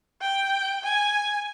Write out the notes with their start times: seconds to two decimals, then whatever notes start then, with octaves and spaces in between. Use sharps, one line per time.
0.21 G5
0.83 G#5